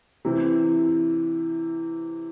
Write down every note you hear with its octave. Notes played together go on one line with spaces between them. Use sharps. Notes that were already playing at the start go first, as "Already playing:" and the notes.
C3 E3 C4